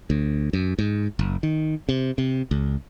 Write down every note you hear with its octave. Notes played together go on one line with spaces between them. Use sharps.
D2
F#2
G#2
F#1
D#3
C3
C3
C#2